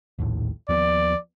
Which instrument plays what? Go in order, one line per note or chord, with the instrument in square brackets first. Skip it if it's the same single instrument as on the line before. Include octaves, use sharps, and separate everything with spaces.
[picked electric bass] A#1 D#2 A2
[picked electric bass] D#2 F3 B3 [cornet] D5